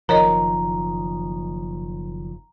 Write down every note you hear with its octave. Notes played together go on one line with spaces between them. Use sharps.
F#1 D#3 F3 A#4 C#5 D#5 A#5